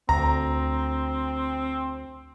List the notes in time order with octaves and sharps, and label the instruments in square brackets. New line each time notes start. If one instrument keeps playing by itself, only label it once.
[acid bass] D2 [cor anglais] C4 [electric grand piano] A#5